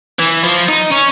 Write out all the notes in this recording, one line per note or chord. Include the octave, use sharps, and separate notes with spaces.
E3
F3
D#4
C#4